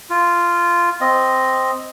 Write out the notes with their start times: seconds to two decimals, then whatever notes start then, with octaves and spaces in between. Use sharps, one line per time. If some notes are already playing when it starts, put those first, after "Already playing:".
0.10 F4
1.01 C4 D#5